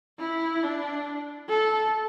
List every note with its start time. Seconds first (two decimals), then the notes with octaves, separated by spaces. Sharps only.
0.19 E4
0.63 D4
1.49 A4